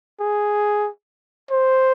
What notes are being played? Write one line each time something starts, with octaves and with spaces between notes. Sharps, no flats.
G#4
C5